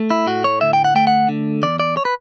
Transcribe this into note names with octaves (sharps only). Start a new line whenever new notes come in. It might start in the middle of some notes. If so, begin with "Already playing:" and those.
Already playing: A3
E4
A2 F#4
C#5
D2 E5
G5
F#5
A3 G5
F#5
D3
E2 D5
D5
C#5
B4